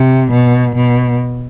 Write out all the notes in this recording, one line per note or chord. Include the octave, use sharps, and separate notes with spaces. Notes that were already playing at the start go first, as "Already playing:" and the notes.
Already playing: C3
B2
B2